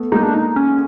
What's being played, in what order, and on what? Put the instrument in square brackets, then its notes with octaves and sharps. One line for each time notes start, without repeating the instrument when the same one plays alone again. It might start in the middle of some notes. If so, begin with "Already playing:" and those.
Already playing: [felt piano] A3 B3
[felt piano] G#3 A#3 [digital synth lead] D#4
[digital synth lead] D4
D#4
C#4